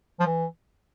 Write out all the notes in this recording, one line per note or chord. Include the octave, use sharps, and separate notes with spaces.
F3
E3